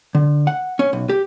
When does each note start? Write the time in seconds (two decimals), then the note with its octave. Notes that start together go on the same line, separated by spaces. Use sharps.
0.15 D3
0.47 F#5
0.79 C#4
0.93 B1
1.09 G4